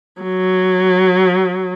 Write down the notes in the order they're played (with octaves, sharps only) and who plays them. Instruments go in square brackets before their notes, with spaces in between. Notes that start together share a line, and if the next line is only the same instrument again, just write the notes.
[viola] F#3